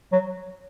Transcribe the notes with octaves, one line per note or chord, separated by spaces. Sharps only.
F#3